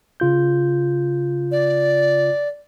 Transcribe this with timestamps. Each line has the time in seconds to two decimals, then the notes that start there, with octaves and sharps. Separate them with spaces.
0.20 C#3 F4 G6
1.52 D5